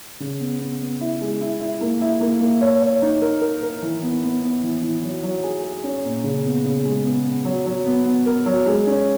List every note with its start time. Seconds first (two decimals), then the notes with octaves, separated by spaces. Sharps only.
0.20 C#3
0.40 B3
0.60 B3
0.80 B3
1.01 E4
1.21 G#3
1.41 E4
1.60 E4
1.81 A#3
2.01 E4
2.21 A#3
2.41 A#3
2.61 C#5
2.82 C#5
3.02 D#4
3.22 A#4
3.41 A#4
3.63 A#4
3.82 E3
4.02 B3
4.23 B3
4.43 B3
4.63 E3
4.83 E3
5.03 F#3
5.23 F#3
5.44 G#4
5.64 G#4
5.83 C#4
6.05 A#2
6.24 C#3
6.44 B3
6.64 C#3
6.85 G#3
7.05 B3
7.24 B3
7.45 F#3
7.66 F#3
7.86 B3
8.06 B3
8.26 A#4
8.46 F#3
8.66 G#3
8.87 C#4